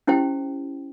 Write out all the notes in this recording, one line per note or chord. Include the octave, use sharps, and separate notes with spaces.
C#4 E4 G4 C5 G5